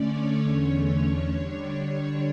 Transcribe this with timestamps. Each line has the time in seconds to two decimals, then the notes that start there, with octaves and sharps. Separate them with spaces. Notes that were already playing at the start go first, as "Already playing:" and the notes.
Already playing: D3 A3 C#4 C#5 D5
0.39 E2 D3 A3 C#4
1.31 D3 G3 D4 C#5